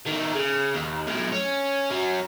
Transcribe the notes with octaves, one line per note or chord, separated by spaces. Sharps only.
D#3 A3
C#3
D#2
B1 A2
C#4
F#3 C#4